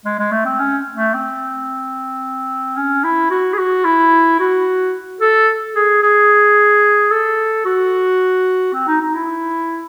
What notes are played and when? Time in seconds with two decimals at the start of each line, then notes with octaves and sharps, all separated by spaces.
0.05 G#3
0.19 G#3
0.32 A3
0.45 C4
0.59 C#4
0.95 A3
1.14 C4
2.77 C#4
3.04 E4
3.30 F#4
3.53 G#4
3.58 F#4
3.85 E4
4.39 F#4
5.21 A4
5.76 G#4
6.02 G#4
7.11 A4
7.65 F#4
8.73 C4
8.87 D#4
9.01 D#4
9.14 E4